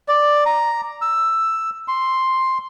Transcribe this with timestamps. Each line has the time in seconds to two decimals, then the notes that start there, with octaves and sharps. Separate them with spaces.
0.08 D5
0.46 A#5
1.02 E6
1.88 C6